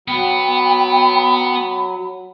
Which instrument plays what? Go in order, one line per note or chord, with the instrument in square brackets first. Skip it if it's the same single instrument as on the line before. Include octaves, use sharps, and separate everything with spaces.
[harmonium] F#3 [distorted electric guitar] B3 [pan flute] G5 [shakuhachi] B5